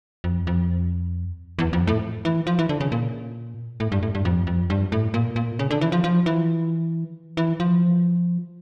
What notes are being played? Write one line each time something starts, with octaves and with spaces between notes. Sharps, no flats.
F2
F2
E2
F2
A2
E3
F3
E3
D3
C#3
A#2
A2
G2
A2
G2
F2
F2
G2
A2
A#2
A#2
C#3
D3
E3
F3
F3
E3
E3
F3